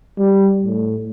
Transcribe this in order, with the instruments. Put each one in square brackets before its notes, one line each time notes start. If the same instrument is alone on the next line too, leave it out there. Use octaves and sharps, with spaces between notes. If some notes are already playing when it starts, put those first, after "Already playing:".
[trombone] G3
A2